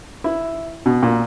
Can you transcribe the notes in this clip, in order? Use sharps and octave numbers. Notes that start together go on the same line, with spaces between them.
E4
B2
A#2